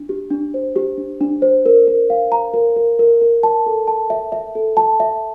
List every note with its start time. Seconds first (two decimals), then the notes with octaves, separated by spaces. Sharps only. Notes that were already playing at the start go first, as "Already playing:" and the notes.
Already playing: D4
0.09 G4
0.31 D4
0.54 C5
0.76 G4
0.98 D4
1.21 D4
1.42 C5
1.66 A#4
1.87 A#4
2.10 F5
2.32 A#5
2.54 A#4
2.76 A#4
2.99 A#4
3.21 A#4
3.43 A5
3.66 A4
3.88 A5
4.10 E5
4.32 E5
4.55 A4
4.77 A5
5.00 E5